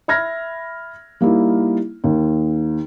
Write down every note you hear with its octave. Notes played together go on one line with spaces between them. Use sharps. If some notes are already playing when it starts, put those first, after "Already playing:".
E5 B5 F6 G#6 A#6
G3 A#3 D#4 E4
D#2